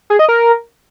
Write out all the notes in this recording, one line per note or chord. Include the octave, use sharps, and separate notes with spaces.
G#4
D#5
A#4